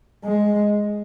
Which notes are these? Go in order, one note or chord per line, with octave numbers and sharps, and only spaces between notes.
G#3